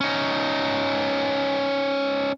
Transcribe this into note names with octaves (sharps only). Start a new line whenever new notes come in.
C#4 D#4